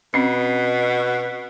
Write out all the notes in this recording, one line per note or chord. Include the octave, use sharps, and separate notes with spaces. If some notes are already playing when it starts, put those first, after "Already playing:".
B2 C4 C#4